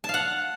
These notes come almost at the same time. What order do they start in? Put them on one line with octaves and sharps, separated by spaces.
A5 F5 F#5